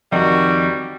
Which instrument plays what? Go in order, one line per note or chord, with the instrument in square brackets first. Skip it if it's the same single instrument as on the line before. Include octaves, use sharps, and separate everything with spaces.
[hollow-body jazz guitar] F2 D#3 D#4 [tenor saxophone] G3 [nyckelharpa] F#4